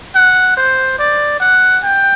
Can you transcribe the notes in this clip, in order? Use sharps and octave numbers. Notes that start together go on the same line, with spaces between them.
F#5
C5
D5
F#5
G5